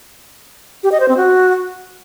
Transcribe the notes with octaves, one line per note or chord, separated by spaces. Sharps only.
G4
D#5
C5
C4
F#4